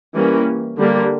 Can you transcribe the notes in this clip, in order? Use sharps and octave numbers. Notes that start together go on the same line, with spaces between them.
E3 G3 A#3 C#4
D3 G3 A#3